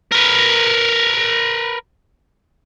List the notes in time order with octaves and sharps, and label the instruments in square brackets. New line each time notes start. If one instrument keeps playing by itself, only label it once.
[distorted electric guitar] A#4 B4